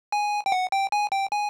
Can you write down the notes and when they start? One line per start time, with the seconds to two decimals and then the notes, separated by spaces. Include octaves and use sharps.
0.12 G#5
0.46 G5
0.52 F#5
0.72 G5
0.92 G#5
1.12 G5
1.32 G#5